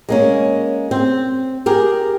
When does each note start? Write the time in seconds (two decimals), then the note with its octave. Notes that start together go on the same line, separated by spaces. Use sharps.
0.09 G#3 A#3 C#4
0.91 C4
1.66 G4 G#4 A#4